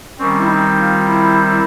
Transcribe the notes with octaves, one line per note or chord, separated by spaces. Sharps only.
D#3 G3 C4 C#4
E4
D#4
F4
E4
E4